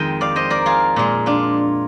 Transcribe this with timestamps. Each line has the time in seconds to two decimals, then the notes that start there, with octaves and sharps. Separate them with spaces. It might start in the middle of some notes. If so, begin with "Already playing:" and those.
Already playing: F2 D#3 G#3 D#5 G5
0.21 D5 F5
0.36 C5 D#5
0.50 A#4 D5
0.66 F4 G#4
0.96 A#2 G#3
1.26 D4 F4